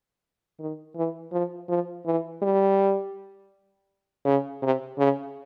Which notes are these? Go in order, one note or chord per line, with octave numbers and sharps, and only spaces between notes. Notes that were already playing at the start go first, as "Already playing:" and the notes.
D#3
E3
F3
F3
E3
G3
C#3
C3
C#3